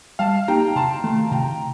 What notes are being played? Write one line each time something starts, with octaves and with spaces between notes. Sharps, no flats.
G3 F5 A5
A#3 D#4 G4 G5 A#5
C3 A5 C6
D#3 A3
C3 G5 A#5